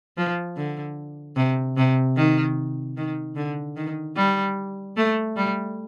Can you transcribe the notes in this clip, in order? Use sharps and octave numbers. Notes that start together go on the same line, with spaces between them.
F3
D3
C3
C3
D#3
D#3
D3
D#3
G3
A3
G3